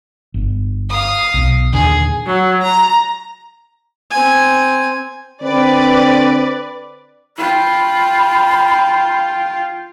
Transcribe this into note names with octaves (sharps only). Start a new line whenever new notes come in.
G1
F5 D#6
B1
D#2 A#2 D3 G#4
F#3
A#5
C4 G#5
D3 C4 B4 D5
F4 G5 B5